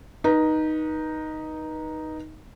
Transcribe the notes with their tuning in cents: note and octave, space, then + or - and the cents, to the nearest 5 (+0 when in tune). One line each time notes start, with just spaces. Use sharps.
D#4 +0 B4 -35